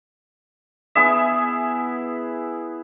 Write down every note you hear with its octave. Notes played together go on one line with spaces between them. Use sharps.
B3 E4 G#4 E5